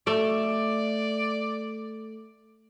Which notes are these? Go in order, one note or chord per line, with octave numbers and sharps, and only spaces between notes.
A3 D5